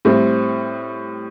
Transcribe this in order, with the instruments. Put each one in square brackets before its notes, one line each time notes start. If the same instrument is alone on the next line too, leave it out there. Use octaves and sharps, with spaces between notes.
[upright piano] A2 G3 C4